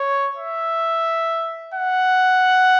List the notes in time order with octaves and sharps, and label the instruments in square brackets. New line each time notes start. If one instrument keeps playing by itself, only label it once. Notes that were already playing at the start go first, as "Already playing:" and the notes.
Already playing: [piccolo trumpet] C#5
E5
F#5